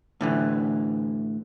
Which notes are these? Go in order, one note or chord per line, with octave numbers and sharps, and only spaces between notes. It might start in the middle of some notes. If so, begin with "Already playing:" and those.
A2 D3 E3